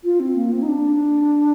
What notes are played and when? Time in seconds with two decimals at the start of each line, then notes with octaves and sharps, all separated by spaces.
0.04 F4
0.20 C4
0.36 A#3
0.52 C4
0.62 D#4
0.68 D4